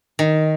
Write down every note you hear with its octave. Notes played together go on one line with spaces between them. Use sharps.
D#3